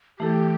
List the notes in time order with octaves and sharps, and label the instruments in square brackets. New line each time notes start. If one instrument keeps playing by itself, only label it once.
[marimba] E3 A3 E4 A4 [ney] G4